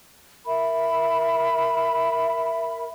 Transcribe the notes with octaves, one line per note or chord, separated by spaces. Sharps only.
A#4 E5 B5